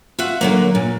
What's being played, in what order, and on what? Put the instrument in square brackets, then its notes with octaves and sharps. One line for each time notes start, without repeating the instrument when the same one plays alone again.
[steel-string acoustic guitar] F4 F#4 E5 F#5
D3 F#3 A#3
A#2